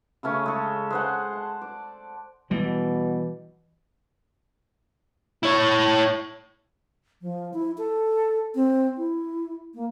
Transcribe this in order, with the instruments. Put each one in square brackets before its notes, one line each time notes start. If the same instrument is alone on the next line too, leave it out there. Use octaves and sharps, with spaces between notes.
[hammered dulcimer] C#3 A3 C#4 G#5
G#3 A4
G#3 C5 F#5
A5
D5
[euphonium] B2 [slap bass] E3 G3
[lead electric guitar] E4 C#5
[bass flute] F3
E4
A4
C4
E4
A#3